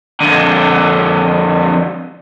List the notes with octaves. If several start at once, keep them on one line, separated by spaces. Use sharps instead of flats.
F2 D3